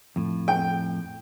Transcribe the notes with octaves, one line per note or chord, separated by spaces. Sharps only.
F2 A2
G5